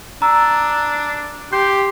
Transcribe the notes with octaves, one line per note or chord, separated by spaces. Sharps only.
D4 A#5 E6
G4 C6 G6